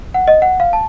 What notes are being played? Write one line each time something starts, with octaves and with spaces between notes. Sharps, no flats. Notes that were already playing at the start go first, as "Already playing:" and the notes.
F#5
D#5
F#5
F5
A5